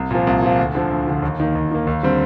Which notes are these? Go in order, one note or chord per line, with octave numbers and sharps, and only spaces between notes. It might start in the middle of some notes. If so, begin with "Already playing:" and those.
Already playing: C2
A#2 F3
C2
A#2 F3
D2
D3 F3
D2
D3 F3
D#2
D#3 A#3
D#2
D#3 A#3
D#2
D3 G3 C4